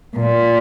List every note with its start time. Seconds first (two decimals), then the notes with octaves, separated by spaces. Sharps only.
0.16 A#2